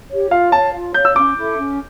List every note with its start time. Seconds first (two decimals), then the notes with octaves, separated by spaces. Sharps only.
0.09 G4 C#5
0.30 F4 F5
0.52 C#5 F5 A5
0.73 F4
0.94 C#5 F5 G6
1.05 E6
1.16 C#4 D6
1.36 E4 A4 E5
1.57 C#4